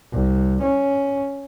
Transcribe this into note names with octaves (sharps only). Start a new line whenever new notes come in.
C2
C#4